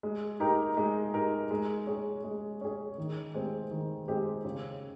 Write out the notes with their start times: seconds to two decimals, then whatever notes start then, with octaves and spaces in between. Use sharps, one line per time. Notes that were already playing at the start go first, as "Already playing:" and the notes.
0.03 G#3
0.40 D#4 G4 A#4
0.77 G#3
1.14 D#4 G4 A#4
1.51 G#3
1.87 C#4 G#4
2.24 G#3
2.61 C#4 G#4
2.98 D#3
3.34 G#3 C4 G4
3.71 D#3
4.08 G#3 C4 G4
4.45 C#3